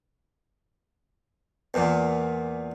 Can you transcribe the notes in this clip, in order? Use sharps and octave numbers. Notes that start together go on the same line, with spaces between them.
E2 A#2